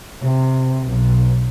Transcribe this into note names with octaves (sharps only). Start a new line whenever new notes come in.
C3
B1